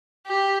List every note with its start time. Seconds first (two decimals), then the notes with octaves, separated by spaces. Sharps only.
0.27 G4